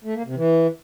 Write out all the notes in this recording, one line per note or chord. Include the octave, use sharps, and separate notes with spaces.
A3
A#3
C3
E3